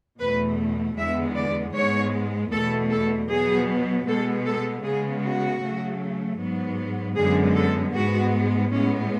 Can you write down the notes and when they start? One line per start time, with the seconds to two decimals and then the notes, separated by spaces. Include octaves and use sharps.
0.20 E2 B2 A3 B4
0.97 E2 D3 G#3 B3 E5
1.36 D5
1.75 G#2 G#3 B3 C#5
2.52 E2 B2 A3 A4
2.91 A4
3.30 B2 F#3 B3 G#4
4.07 B2 G#3 B3 A4
4.46 A4
4.84 C#3 G#3 B3 G#4
5.24 F#4
5.62 C#3 F#3 A3
6.40 G#2 F#3 B3
7.17 F#2 D3 G#3 B3 G#4
7.56 A4
7.94 G#2 G#3 B3 F#4
8.72 A2 G#3 B3 C#4